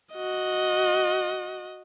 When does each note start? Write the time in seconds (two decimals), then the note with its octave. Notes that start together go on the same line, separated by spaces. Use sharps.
0.14 F#4 D#5